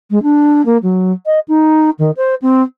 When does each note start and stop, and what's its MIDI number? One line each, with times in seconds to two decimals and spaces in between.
0.11 0.22 56
0.23 0.64 62
0.65 0.77 58
0.83 1.12 54
1.26 1.39 75
1.48 1.90 63
1.99 2.11 51
2.17 2.35 72
2.42 2.63 60